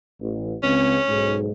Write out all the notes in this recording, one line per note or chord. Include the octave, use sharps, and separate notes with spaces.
A1
C#2 C4 C#4
B1 G#2